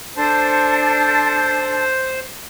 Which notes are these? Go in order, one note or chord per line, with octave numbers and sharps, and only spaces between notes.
D4 A4 C5 A5